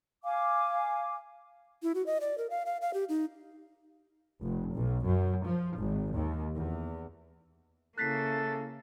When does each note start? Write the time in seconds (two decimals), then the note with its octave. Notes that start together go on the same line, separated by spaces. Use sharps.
0.23 F5 G#5 D6
1.82 E4
1.95 F#4
2.06 D#5
2.21 D5
2.38 A#4
2.50 F5
2.66 F5
2.82 F5
2.94 G4
3.09 D#4
4.42 F1
4.74 B1
5.04 F#2
5.45 F3
5.77 G#1
6.14 D#2
6.56 E2
7.98 C#3 A#3 E4 A4 F#6 A6 B6 C7